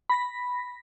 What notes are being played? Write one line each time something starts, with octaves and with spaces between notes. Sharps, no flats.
B5 A#6 B6